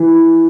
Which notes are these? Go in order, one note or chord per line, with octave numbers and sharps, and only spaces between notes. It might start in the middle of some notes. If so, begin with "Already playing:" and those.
Already playing: E3